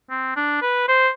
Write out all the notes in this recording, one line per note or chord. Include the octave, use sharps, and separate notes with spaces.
C4
D4
B4
C5